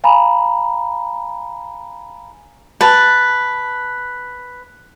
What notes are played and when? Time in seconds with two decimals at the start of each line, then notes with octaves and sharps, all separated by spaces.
0.04 F5 G#5 A#5 B5
2.81 B4 A5